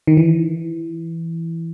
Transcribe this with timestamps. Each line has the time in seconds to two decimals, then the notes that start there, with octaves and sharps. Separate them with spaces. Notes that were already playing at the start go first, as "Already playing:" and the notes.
0.07 D#3
0.17 E3